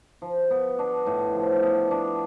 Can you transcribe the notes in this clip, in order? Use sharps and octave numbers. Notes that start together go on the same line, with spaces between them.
F3
B3
D4
A2
F3
B3
D4